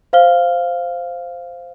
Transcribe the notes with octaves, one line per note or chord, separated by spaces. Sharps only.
C5 F5 F6 G7